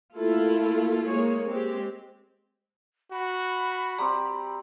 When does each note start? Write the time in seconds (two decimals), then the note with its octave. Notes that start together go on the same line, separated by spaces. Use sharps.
0.17 A3 A#3 E4 F4 A4
1.06 G#3 A#3 G#4 C#5
1.46 G#3 C4 G4
3.12 F#4 B5
3.98 G3 C4 G4 A#5